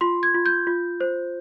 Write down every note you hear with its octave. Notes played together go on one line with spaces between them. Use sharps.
F4 C6
G#6
F4
G6
F4
C5